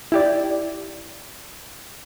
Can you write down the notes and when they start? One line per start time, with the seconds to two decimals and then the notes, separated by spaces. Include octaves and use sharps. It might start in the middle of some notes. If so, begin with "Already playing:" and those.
0.12 E4 G4 D5